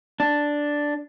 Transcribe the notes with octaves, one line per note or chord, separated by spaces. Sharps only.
D4